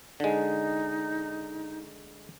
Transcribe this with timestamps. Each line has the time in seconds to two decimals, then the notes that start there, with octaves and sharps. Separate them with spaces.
0.20 D3 G#3 D#4